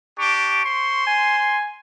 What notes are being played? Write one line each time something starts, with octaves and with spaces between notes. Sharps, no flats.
D4 G4 C#6
C5 C6
G#5